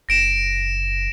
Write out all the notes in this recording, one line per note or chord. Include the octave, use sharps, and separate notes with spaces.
F#1 A#6 D7 E7